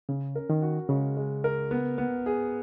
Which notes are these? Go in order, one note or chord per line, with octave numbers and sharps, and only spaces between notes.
C#3 C#4
A#4
D#3
F#4
C#3 G#3
G#3
A#4
B3
B3
G#4